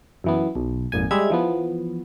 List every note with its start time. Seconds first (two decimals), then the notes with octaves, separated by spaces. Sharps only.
0.24 F#2 E3 B3
0.55 B1
0.92 G#1 F2 A#2 G#5
1.11 G3 G#3 E5 G#6
1.30 E3 F3 B3